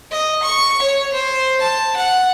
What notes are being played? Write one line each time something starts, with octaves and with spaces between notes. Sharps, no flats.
D#5
C#6
C#5
C5
A5
F#5